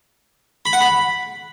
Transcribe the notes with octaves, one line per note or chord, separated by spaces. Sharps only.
B5
F#5
B5